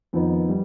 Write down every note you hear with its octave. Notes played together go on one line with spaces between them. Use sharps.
F2 D#3 B3 D#4
G3